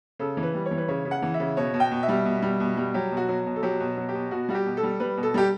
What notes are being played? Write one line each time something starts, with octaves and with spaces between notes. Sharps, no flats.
C#3 A4
E3
B4
G3
C#5
E3
B4
C#3 C#5
C#3
F#5
E3
E5
C#3
B2 C#5
B2
G5
B2
E5
G3
B2
G3
B2
G3
F#3 G4
B2
F#4
F#3
B2
A4
F#3 G4
B2
F#3
G4
B2
B2 F#4
G3 F#4
G4
B2
A4
G3
G3 B4
B2
A4
G3 G4